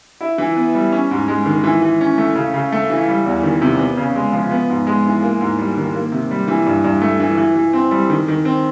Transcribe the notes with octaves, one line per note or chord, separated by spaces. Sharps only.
E4
E3
B3
G3
C#4
G#2
G#3
D#3
E3
E3
C#4
A3
C#3
C#3
A3
E3
G3
E2
D#3
C3
B3
C#3
G#3
F3
B3
G#2
G#3
E3
A#3
G#2
G3
D#3
A#3
C3
G3
E3
G2
G2
A3
E3
E3
E3
C4
G3
D#3
D#3
C4